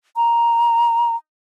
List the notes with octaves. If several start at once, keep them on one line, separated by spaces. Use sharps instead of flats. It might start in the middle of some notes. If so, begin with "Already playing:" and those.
A#5